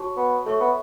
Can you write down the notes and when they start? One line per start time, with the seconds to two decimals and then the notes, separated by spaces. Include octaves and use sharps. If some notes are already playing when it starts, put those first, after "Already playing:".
Already playing: F#4 C#5 A5 C#6
0.17 B3
0.46 A3 A4 C#5 E5 C#6
0.60 B3